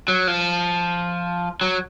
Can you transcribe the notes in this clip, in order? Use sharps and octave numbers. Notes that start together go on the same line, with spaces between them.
F#3
F3
F#3